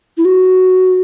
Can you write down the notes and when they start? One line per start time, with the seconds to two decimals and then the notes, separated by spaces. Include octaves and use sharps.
0.17 E4
0.25 F#4